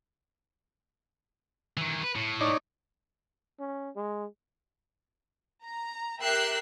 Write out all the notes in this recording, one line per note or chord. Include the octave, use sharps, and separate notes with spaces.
D#3 E3
B4
A2
D#4 C#5 D5
C#4
G#3
A#5
G4 A#4 E5 E6 F#6 C7